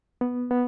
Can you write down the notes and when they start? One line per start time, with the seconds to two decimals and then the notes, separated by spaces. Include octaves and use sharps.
0.21 B3
0.51 B3